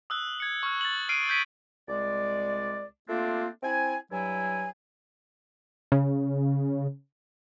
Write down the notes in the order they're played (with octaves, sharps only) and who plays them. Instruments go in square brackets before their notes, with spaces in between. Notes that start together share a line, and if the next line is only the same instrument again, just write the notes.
[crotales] D#6 E6 F#6
G#6 C#7
C#6 F6
A6 F#7
F6 C7 D7 D#7
G6 G#6 B6 D7 D#7
[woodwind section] C2 G#3 D5
A3 A#3 C4 D4 F4
C4 E4 G#5
G2 F#3 E4 G#5
[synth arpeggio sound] C#3